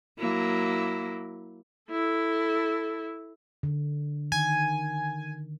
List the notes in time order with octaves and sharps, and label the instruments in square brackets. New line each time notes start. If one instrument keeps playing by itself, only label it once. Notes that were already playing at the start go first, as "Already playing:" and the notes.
[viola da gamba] F#3 A#3 E4
[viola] E4 A4
[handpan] D3
[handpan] D#3 [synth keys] G#5